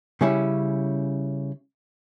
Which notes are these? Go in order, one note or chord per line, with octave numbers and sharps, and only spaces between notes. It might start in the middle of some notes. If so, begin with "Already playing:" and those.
C#3 G3 C#4 E4